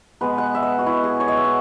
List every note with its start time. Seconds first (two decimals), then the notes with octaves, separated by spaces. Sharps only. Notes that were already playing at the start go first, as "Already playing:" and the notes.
0.21 B2 G#3 B3 B4
0.38 F#5
0.55 E5
0.63 D#5
0.79 F#4
0.86 E4
1.04 G#4
1.20 C#5
1.28 D#5
1.37 E5
1.44 F#5